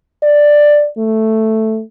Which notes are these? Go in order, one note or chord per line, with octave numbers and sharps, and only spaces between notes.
D5
A3